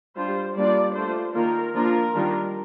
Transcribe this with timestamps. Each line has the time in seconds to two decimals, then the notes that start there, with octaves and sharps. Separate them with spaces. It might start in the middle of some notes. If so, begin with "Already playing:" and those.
0.16 G3 D4 F4 C5
0.56 G3 A#3 D4 F4 D5
0.96 A3 D4 F4 C5
1.35 D#3 A#3 F4 A#4
1.75 F3 A#3 D4 F4 A#4
2.14 D#3 G3 D4 F4